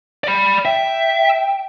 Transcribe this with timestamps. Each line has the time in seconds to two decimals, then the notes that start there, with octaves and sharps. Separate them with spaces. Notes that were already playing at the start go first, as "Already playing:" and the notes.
0.24 D5 B5
0.65 E5 G5